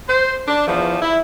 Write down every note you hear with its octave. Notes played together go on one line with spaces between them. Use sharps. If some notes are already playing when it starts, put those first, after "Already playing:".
C5
D4
E2 F3
E4